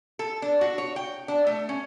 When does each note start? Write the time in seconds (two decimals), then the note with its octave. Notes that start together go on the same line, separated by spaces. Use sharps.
0.19 A4
0.42 D4
0.61 F#4
0.78 C#5
0.96 G5
1.28 D4
1.47 A3
1.69 C#4